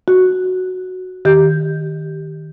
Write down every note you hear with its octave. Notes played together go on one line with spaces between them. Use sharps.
F#4
D#3 G4 G6